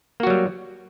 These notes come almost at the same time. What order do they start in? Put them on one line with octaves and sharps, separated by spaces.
A#3 F#4 F#3 G3